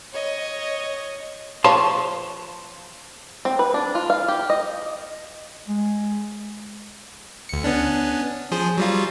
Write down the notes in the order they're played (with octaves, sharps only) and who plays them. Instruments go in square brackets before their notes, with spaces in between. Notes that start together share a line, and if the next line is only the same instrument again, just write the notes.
[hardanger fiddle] C#5 D#5
[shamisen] F3 B4 C#5 [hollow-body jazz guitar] A5 C6
[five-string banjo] C4
B4
D4
F4
F5
G4
D#5
[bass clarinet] G#3
[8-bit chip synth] D2 C#7
B3 C#4 D4
F3 G#4 C5
F#3 G3 F4